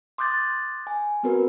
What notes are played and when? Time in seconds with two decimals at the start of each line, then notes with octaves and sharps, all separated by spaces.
0.18 C6 D6 D#6 F#6 G6 A6
0.87 G#5
1.23 B3 C4 F#4 A#4 B4